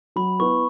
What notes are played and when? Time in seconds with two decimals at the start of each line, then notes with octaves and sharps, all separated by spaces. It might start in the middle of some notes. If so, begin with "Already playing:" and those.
0.16 F#3 B5
0.39 B3 E4 B4 C#6